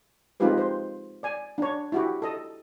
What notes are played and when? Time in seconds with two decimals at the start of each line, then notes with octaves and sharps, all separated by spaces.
0.40 G#3 C4 D#4 F4 G4 B4
0.58 C5
1.23 D5 G#5
1.58 D4 C#5
1.92 E4 F#4 G4
2.22 A4 D#5